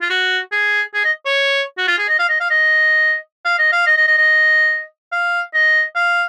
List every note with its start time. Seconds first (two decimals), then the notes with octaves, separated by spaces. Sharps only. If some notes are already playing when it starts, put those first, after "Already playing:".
0.02 F4
0.10 F#4
0.52 G#4
0.94 G#4
1.04 D#5
1.26 C#5
1.78 F#4
1.88 F4
1.98 G#4
2.09 D#5
2.19 F5
2.29 D#5
2.40 F5
2.50 D#5
3.45 F5
3.59 D#5
3.72 F5
3.87 D#5
3.97 D#5
4.07 D#5
4.18 D#5
5.12 F5
5.54 D#5
5.95 F5